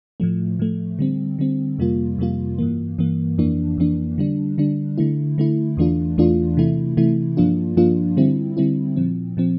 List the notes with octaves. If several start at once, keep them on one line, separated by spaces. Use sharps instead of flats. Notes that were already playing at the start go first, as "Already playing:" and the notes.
A2 F3 A3
A2 F3 A3
D3 G3 C4
D3 G3 C4
F2 C3 G3 A#3 F4
F2 C3 G3 A#3 F4
G2 E3 A#3
G2 E3 A#3
F2 E3 A#3 D4
F2 E3 A#3 D4
D3 G3 D4
D3 G3 D4
D3 A3 E4
D3 A3 E4
E2 E3 A3 D4 F4
E2 E3 A3 D4 F4
C3 E3 A3 E4
C3 E3 A3 E4
G2 F3 A#3 D4 F4
G2 F3 A#3 D4 F4
D3 G3 C4 E4
D3 G3 C4 E4
A#2 F3 C4
A#2 F3 C4